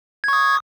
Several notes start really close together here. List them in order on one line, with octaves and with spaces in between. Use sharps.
G#6 C#6 D#6